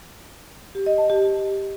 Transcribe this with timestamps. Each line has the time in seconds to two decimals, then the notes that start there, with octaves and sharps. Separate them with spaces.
0.75 G4
0.86 D#5
0.98 A5
1.10 G4